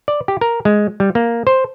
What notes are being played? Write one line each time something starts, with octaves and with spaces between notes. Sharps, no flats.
D5
G4
A#4
G#3
G3
A#3
C5